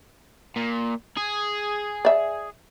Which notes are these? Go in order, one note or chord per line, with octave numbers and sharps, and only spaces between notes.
A#2
G#4
D5 E5